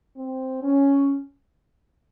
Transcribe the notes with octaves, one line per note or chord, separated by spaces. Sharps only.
C4
C#4